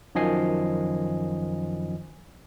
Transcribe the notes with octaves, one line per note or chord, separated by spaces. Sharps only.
F#2 D#3 F3 D#5 G#5 C7